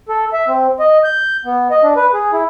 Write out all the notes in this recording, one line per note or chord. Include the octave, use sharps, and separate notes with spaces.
A4
E5
C4
D#5
G6
B3
D#5
D4
B4
G#4
E4